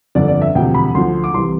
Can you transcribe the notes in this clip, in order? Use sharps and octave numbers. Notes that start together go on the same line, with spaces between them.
G1 F2 D3 D5
D5
E5
E1 D2 C3 F3 G5
B5
D2 D3 F3 C6
D6
C2 C3 E3 C6